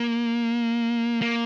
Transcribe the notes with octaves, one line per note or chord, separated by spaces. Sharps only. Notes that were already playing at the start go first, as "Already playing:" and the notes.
Already playing: A#3
A#3